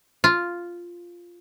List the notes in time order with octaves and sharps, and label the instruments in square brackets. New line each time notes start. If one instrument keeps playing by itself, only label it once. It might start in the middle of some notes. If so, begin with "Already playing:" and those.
[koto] F4